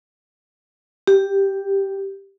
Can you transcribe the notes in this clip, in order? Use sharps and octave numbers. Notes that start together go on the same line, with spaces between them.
G4